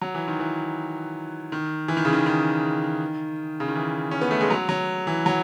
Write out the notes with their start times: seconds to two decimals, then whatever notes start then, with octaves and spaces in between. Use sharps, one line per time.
0.02 F#3
0.15 E3
0.28 D#3
0.40 E3
1.52 D#3
1.88 E3
1.97 D#3
2.05 C#3
2.13 D#3
2.26 D#3
3.60 C#3
3.68 D#3
3.75 E3
4.11 C#4
4.21 B3
4.31 A3
4.41 G#3
4.50 F#3
4.69 F#3
5.07 E3
5.26 F#3